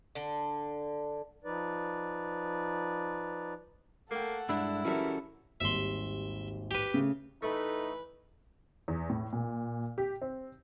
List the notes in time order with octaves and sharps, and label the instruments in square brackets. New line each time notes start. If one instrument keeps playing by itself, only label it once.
[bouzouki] D3
[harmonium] F3 D#4 B4 D5
[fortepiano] A3 G5 [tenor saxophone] A#3 [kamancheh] A4 F#5
[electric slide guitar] G2 G#3 D4 [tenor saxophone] E4
[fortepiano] E3 G3 E5 [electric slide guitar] C#4 F#4 A4 [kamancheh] A#4
[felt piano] G#1 D#2 G3 [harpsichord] E5 C6
[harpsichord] G4 B4
[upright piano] C#3 [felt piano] A3
[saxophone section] E3 B4 [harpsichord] A3 [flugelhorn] D#4 [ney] A4
[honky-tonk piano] E2
A2
A#2
G4
C4